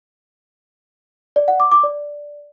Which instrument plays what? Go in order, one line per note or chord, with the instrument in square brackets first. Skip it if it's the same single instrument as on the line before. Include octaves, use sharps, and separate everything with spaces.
[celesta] D5
F#5
D6
D6
D5